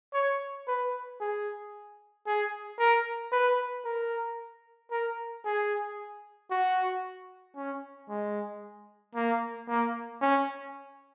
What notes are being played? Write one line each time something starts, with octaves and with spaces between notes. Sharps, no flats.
C#5
B4
G#4
G#4
A#4
B4
A#4
A#4
G#4
F#4
C#4
G#3
A#3
A#3
C#4